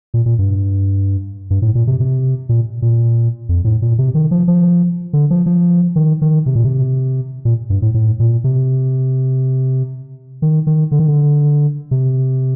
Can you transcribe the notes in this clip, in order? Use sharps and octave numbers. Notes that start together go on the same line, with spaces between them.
A#2
A#2
G2
G2
A2
A#2
C3
C3
A#2
A#2
F2
A2
A#2
C3
D#3
F3
F3
D3
F3
F3
D#3
D#3
C3
A#2
C3
A#2
G2
A2
A2
A#2
C3
D#3
D#3
D3
D#3
D3
C3